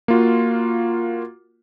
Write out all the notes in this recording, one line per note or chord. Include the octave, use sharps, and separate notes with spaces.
A#3 F4 F#4